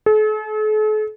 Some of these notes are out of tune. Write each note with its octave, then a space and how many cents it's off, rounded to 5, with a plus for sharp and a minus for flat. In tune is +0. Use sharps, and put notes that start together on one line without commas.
A4 -45